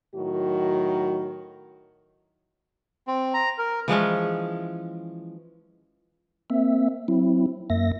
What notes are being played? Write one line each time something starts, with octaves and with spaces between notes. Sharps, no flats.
A2 D#3 F#3 F#4
C4
A#5
A#4
E3 F3 G#3 C#4
A#3 C4 E5
F#3 C4 E4
F#2 A#3 E5 A#6